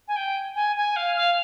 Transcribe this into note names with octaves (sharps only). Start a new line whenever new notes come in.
G#5
G5
G#5
G#5
F5
F5